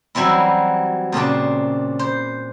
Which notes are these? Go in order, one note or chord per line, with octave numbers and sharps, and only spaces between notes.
E3 F#3 G3 C4 E4
A#2 C#3 C4 D4
C5